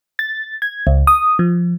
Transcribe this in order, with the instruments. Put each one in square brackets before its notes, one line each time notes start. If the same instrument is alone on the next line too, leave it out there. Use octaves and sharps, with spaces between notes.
[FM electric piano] A6
G#6
C#2
D#6
F3